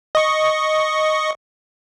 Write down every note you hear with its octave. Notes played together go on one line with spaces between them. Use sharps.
D#5 C#6